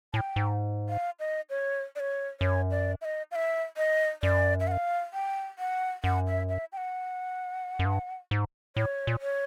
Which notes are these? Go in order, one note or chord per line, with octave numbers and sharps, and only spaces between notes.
A2 A5
G5
G#2
F5
D#5
C#5
D5
C#5
F#2 C#5
D5
E5
D#5
F5
E5
D#5
F#2 D5
E5
F#5
F5
G5
F#5
F#2 F#5
E5
E5
G5
F#5
F#2
G2
G#2
A2 C#5
A#2
C#5